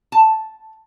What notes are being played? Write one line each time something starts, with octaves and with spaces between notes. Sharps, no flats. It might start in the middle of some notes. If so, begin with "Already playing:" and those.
A5